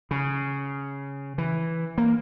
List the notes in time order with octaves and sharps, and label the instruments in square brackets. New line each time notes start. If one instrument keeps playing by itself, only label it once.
[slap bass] C#3
E3
A#3